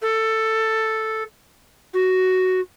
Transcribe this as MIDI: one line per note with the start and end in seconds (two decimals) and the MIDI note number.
0.02 1.22 69
1.93 2.60 66